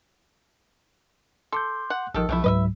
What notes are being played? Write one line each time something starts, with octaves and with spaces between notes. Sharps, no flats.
A4 C6 D6 G6
F#5
A1 D#3 F3 A4
B1 C3 F3 A3 E4
C#2 G#2 F#3 B4 D#5 E5